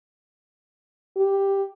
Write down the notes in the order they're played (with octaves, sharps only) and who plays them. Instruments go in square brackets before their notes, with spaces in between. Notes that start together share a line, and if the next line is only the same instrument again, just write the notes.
[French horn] G4